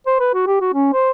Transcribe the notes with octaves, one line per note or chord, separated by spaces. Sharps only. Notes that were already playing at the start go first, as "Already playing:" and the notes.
C5
B4
F#4
G4
F#4
C#4
C5